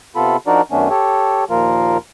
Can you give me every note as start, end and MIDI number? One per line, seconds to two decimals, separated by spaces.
0.16 0.37 48
0.16 0.37 59
0.16 0.37 65
0.16 0.37 69
0.16 0.37 83
0.47 0.62 53
0.47 0.62 62
0.47 0.62 63
0.47 0.62 66
0.47 0.62 70
0.47 0.62 74
0.71 0.89 42
0.71 0.89 51
0.71 0.89 57
0.71 0.89 59
0.71 0.89 61
0.71 0.89 62
0.90 1.44 67
0.90 1.44 69
0.90 1.44 73
1.50 1.98 39
1.50 1.98 46
1.50 1.98 53
1.50 1.98 58
1.50 1.98 65
1.50 1.98 70